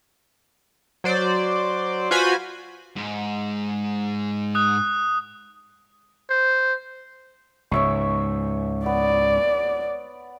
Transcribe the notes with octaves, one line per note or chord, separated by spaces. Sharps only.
F#3 C5 D5
F4 F#4 B4 C5 G#5 B5
G#2 G#3
D#6 F#6
C5
C#2 G#2 C#5 E5 C#6
B3 D5